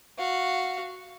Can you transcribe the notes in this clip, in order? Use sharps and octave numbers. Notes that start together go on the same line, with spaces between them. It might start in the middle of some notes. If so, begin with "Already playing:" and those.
F#4 F5